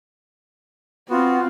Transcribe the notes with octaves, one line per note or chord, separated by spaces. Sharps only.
B3 C4 F4 F#4